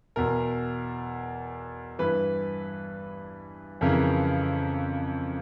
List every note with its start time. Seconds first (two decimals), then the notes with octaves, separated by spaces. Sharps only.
0.16 E2 B2 A#4
1.99 G2 E3 B4
3.81 F2 C#3 E3 A#4